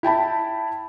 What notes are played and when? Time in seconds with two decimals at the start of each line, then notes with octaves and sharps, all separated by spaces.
0.03 E4 G5 A5 B5